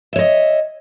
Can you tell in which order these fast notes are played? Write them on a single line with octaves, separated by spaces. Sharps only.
E5 C#5 D#5